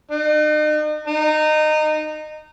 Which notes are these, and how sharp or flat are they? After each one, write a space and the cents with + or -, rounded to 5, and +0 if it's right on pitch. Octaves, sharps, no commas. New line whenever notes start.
D#4 -40
D#4 -20